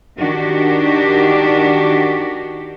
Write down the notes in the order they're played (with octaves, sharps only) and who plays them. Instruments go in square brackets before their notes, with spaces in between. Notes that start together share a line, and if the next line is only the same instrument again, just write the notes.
[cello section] D#3 D4 F#4 G4